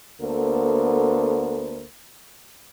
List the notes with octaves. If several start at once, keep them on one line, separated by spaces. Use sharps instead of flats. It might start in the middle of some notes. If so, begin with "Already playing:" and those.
D2 A#3 B3 A4 C5